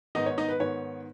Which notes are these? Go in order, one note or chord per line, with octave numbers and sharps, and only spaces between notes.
G#2 D#3 B3 D#4 D#5
C#5
D#4 D#5
B4
G#2 D#3 B3 C#5